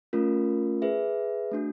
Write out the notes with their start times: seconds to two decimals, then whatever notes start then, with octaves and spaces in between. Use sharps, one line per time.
0.13 A3 C#4 F4 A#4
0.82 G#4 B4 E5
1.52 A3 D4 F#4